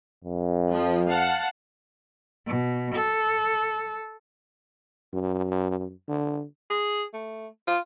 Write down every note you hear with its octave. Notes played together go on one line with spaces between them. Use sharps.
F2
F3
F5 F#5 A5
B2
A4
F#2
D3
G#4
A3
F4